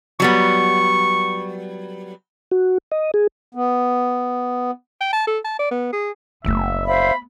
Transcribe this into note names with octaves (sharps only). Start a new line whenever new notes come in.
F#3 G3 B3 C#6
F#4
D#5
G#4
B3
G5
A5
A4
A5
D5
B3
G#4
F#1 A3 B3 E5
C5 E5 F5 B5